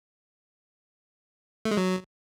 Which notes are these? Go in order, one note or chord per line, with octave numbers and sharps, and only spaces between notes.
A3
G#3
F#3